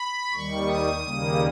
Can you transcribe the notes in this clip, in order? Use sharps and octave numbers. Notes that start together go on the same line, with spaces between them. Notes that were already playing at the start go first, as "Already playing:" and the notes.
Already playing: B5
D#2 D#3 G3 C#6
D#6
D#2 C#3 G3 A#3